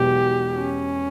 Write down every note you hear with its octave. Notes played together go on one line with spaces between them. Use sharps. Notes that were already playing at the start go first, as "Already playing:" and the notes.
Already playing: E1 E2 B2 F#3 G4
C#4